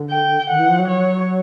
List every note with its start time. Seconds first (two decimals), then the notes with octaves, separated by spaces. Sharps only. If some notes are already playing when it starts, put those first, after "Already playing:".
Already playing: D3
0.10 G5
0.50 D#3 F#5
0.59 E3
0.69 F3
0.79 F#3
0.87 C#5